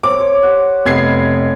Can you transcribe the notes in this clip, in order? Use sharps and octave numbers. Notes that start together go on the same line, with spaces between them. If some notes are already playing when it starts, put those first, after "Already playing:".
C4 C#5 D6
C#5
G4 F#5
F1 B3 D#5 B5 G#6 C7